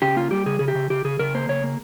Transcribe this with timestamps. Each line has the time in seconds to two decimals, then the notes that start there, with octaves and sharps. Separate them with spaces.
0.02 C#3 G4
0.16 A#3 F4
0.31 G3 G4
0.46 C#3 G#4
0.59 C#3 G#4
0.68 G4
0.75 C#3
0.90 C#3 G4
1.04 C#3 G#4
1.19 C#3 A#4
1.34 A#3 C5
1.49 C#3 C#5
1.64 A#3